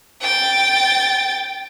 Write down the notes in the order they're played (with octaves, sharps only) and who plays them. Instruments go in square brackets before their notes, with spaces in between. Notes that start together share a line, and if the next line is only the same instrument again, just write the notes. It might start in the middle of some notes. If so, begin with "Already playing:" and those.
[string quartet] G5 A6